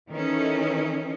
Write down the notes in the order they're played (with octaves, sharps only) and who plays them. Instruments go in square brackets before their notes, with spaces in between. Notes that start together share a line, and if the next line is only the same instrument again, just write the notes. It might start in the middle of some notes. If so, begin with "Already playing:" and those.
[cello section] D#3 E3 C#4 D#4 A4